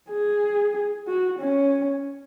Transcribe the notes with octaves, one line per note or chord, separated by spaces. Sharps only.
G#4
F#4
C#4